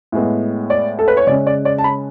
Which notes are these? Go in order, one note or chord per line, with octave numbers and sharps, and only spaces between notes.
A2 G#3 B3
D5
A4
B4
C#5
C#3 G#3 C#4 D5
D5
D5
A5
B5